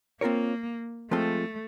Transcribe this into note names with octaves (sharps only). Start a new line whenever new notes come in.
A#3 C4 F4 A#4 C#5
F3 G#3 A3 C4 F4 A4